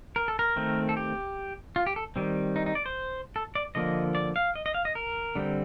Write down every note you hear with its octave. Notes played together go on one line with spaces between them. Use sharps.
A#4
A4
A#4
D#3 A3 C4
A4
G4
F4
G4
A4
D#3 G3 C4
D#4
D#4
D5
C5
A4
D5
D3 F3 A#3 D#5
D5
F5
D#5
D#5
F5
D#5
A#4
D3 G3 C4